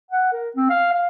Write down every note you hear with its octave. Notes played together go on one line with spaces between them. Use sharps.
F#5
A#4
C4
F5
F5